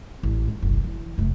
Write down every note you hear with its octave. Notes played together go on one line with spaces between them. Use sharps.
A1
G#2
F#1 B1
E3
F1 A3